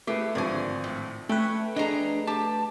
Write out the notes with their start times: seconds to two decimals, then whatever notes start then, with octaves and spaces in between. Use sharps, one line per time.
0.07 A3 E4 G4 G#4 B4
0.35 G#1 D3 F3 G#5 C#6
0.84 A2
1.29 A3 C#4 B4 G5
1.76 D4 G#4 D#5 A#5
2.27 G4 A5